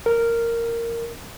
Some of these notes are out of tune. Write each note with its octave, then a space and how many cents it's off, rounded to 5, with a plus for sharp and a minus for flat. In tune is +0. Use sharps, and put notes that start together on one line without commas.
A#4 -10